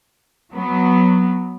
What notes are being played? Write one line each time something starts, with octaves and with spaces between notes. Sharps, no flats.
F#3 B3